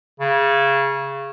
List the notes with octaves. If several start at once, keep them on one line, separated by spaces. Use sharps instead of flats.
C#3